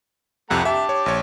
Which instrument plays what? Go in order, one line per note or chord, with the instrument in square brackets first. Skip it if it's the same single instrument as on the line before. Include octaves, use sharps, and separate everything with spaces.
[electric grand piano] C2 F2 C3 [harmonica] A3 F#5 A#5
[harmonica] G4 A5 D6 [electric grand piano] E5
[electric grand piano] C#5
A#1 C#5